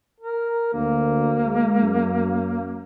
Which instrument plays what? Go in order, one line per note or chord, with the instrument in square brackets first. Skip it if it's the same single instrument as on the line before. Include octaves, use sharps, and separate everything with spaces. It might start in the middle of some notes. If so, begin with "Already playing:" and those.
[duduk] A#4
[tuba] D2 [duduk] A#3
[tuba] G#3
F#2